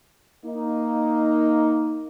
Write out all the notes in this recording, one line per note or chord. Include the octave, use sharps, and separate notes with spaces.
A#3 D#4